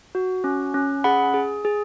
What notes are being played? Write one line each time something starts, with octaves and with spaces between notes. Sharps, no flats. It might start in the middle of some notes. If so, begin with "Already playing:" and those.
F#4
C#4
C#4
G#4 F#5 B5
G#4
G#4